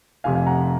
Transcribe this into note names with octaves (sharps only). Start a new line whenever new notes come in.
F1 F2 C3 F5 G#5
F5 G#5
F#5 A#5